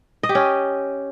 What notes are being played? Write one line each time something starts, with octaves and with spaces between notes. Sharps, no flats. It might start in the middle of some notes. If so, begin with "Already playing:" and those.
D#5
G4
C#4